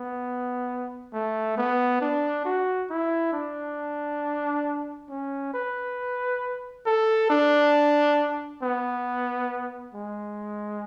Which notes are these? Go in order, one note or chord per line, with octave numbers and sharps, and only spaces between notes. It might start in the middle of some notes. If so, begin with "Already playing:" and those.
Already playing: B3
A3
B3
D4
F#4
E4
D4
C#4
B4
A4
D4
B3
G#3